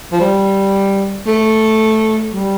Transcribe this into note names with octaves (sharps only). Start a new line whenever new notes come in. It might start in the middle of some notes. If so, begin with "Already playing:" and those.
F3
G3
A3
G3